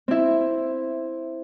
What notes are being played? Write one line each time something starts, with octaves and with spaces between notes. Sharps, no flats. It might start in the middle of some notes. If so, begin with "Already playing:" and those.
C4 E4